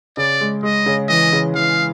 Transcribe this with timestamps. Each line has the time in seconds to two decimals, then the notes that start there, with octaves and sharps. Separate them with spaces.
0.17 C#3 D5
0.41 G#3
0.63 G#3 D#5
0.86 C#3
1.09 E3 D#5
1.32 C#3
1.55 E3 F5